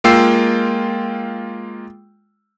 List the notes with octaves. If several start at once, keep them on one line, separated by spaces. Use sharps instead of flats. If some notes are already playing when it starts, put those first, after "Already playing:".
G#3 A#3 F4 G5 E6 C7